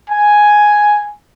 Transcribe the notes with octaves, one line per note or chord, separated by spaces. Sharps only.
G#5